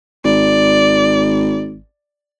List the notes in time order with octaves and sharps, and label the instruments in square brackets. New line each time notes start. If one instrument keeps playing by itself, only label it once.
[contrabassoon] G#1 [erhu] D5